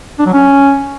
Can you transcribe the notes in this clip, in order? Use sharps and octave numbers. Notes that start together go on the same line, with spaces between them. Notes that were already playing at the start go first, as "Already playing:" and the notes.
D4
F#3
C#4